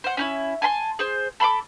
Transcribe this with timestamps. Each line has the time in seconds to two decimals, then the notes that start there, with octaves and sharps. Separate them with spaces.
0.04 C5 F#5
0.17 C#4 D#4 E4
0.62 G#5 A5 B5 C6
0.99 G#4 C5
1.40 A4 B5 C6 D6